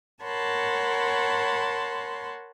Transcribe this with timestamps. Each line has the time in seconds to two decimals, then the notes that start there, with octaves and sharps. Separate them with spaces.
0.23 A#4 C#5 F#5 A5 B5 C6